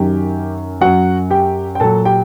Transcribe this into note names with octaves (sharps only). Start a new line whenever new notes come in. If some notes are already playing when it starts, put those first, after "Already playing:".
Already playing: F#2 D#3 F#3 G4
F#2 F#3 F#4 F#5
G4 G5
G5
A#2 F#3 A4 A5
G4 G5